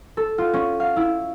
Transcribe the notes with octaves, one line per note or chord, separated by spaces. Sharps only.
A4
F4
C#4
F5
E4